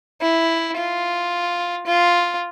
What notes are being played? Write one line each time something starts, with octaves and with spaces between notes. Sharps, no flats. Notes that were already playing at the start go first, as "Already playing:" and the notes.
E4
F4
F4